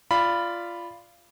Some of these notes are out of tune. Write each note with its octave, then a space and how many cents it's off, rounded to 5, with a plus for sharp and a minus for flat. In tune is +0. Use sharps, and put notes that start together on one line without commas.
F4 -15 D5 +0 B5 +0